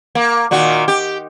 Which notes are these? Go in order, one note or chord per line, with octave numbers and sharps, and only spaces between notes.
A#3
A#2 D#3 F#4
G4